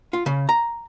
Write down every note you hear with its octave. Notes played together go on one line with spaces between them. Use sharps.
F4
C#3
A#5